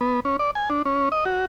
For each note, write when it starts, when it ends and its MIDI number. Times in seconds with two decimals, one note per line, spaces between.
0.01 0.20 59
0.25 0.37 61
0.39 0.51 74
0.55 0.69 80
0.70 0.82 62
0.85 1.09 61
1.12 1.25 75
1.25 1.45 66